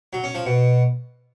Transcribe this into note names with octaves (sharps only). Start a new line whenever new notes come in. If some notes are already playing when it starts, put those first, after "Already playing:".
F#3
C#4
F3
B2